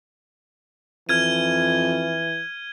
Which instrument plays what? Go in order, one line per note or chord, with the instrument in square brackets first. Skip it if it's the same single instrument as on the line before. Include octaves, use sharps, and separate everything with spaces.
[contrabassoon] F2 [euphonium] E3 [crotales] F6 G#6 D#7